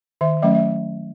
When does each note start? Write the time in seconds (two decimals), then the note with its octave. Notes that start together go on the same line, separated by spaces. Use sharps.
0.21 D#3 E5
0.42 F#3 A3 C#4 E5
0.55 E5